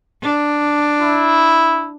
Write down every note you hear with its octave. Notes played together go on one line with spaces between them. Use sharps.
D4
E4